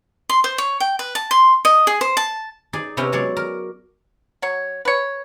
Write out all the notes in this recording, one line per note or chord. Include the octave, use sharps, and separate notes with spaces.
C6
C5
C#5
G5
B4
A5
C6
D#5
G#4
C5
A5
D#4 G#4 D5
C3 B3 C#4 E4 G5 A#5
F#3 G#3 C#5 D5
A#4
F#3 C#5
B4 C#5